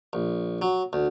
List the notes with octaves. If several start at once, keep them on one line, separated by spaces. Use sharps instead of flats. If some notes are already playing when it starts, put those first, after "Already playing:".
A#1
F#3
D2